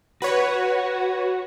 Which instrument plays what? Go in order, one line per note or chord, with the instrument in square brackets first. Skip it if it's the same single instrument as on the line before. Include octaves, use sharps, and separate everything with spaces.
[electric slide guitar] F#4 [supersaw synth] B4 C#5